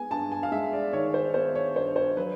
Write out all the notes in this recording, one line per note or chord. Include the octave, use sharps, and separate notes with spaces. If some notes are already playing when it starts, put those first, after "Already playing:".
Already playing: G#3 B3 G#5
G2 A5
G#5
F5
G#3 E5
D5
D#3 C#5
C5
B3 C5
C#5
G2 C5
C5
F#3 B4